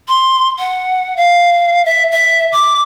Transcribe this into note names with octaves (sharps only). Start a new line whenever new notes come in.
C6
F#5
F5
E5
E5
D6